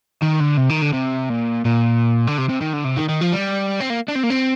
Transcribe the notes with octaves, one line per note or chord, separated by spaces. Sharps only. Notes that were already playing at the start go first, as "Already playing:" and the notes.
D#3
D3
C3
D#3
D3
C3
A#2
A#2
D3
C3
C3
D#3
D3
C3
D#3
D#3
F3
G3
C4
A#3
D4
C4
A#3
C4